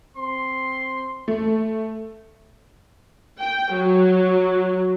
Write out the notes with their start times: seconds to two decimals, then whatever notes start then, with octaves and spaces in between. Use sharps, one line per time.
0.16 C4 C6
1.28 A3
3.40 G5
3.74 F#3